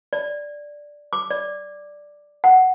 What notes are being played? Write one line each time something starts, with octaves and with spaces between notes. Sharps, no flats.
D5
D6
D5
F#5